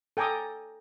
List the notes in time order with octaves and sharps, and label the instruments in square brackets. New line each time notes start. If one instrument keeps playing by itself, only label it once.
[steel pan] A4 G5 G#5 A#5 D6 D#6